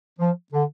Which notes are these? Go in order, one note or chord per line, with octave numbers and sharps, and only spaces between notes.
F3
D3